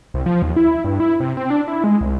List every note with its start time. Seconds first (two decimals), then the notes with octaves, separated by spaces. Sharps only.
0.14 C2
0.26 F3
0.42 D#2
0.56 E4
0.85 G2
1.00 E4
1.20 C3
1.37 C4
1.50 D4
1.68 E4
1.84 G#3
2.01 C2